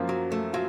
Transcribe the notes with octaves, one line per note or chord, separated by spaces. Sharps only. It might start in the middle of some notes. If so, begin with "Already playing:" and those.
Already playing: F#2 F3 A#3 F4
F#3
A3
F#3 F4